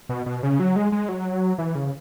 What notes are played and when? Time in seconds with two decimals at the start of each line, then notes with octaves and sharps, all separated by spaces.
0.09 B2
0.26 B2
0.43 C#3
0.60 F#3
0.76 G#3
0.92 G#3
1.09 F#3
1.58 E3
1.75 C#3